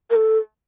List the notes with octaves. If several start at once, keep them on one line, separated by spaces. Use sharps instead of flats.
A#4
A4